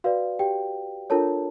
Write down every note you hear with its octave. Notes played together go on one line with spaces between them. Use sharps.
F#4 B4 D5 F5
G4 G5
D4 F4 A4 A#4 C#5 A5